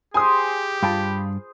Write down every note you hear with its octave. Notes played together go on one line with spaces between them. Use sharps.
G4 G#4 C5 G#5 C6 D#6
G2 F4 G5 A5 B5